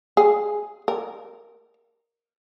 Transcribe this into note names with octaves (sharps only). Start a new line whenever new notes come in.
G#4
A#4